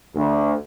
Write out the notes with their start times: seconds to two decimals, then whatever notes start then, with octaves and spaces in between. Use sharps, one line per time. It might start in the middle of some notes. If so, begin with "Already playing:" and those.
0.16 D2